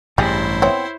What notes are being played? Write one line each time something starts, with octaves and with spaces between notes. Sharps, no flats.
A1 G2 E4 G4 G#4 C5
B3 C4 C#5 E5